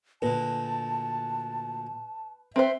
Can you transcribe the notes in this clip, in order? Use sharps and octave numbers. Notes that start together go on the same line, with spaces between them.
D2 A#2 B4 A5
C4 B4 C5 E5